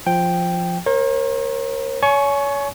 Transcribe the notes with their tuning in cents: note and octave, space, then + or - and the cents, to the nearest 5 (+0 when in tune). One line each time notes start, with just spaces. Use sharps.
F3 +0 G5 +0
A#4 +10 C#5 -45
C#5 +30 G#5 +30 C#6 +0